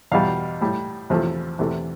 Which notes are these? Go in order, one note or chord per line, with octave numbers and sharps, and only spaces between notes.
E2 B2 G3 F5
A2 G3
E2 C3 F3 A3
E2 C3 E3 A3